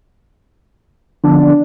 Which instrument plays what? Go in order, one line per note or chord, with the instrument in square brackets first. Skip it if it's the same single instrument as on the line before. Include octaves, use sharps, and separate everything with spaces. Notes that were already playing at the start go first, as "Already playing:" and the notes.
[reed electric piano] D3 F3 B3 [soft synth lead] D4